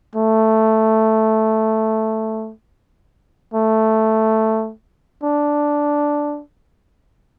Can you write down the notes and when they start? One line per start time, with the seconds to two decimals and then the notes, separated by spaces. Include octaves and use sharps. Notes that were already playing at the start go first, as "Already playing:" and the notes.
0.15 A3
3.54 A3
5.24 D4